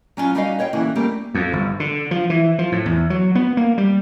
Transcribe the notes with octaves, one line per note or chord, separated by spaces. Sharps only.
F#3 C#4 D4 F4
G3 C#4 D#4 F#4 D#5 F5
C5 C#5 D#5 G5
D3 E3 A#3 C#4 E4 F#4
G3 A3 A#3 C4 C#4 G4
F2
G1
D3
F3
E3
F3
A2
E2
F#3
B3
A#3
G3